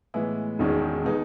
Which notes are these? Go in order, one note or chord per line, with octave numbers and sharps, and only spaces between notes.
A2 E3 G#3 B3 E4
E1 E2 D#3 G#3 C#4
B2 G#3 B3 D#4 G#4